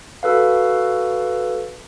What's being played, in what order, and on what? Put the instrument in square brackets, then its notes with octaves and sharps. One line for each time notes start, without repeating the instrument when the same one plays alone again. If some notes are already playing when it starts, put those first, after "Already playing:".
[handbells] F#4 A4 B4 F5